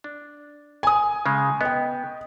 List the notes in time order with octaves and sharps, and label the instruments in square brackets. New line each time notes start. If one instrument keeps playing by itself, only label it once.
[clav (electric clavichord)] D4
[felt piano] G#5 D#6
[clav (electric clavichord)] C#3 G#3
[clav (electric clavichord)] B3 [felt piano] D#5 G5